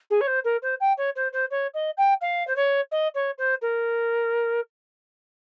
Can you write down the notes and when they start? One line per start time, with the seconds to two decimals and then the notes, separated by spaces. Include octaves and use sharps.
0.10 G#4
0.21 C#5
0.27 C5
0.44 A#4
0.62 C5
0.80 G5
0.97 C#5
1.15 C5
1.33 C5
1.50 C#5
1.74 D#5
1.97 G5
2.21 F5
2.47 C5
2.56 C#5
2.91 D#5
3.14 C#5
3.38 C5
3.61 A#4